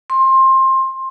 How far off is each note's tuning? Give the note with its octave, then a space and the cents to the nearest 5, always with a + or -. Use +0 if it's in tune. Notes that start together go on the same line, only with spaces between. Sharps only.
C6 +20